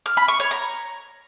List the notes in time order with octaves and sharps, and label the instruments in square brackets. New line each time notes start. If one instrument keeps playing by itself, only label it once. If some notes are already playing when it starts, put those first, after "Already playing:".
[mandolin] F6
B5
C#6
C#5
A#5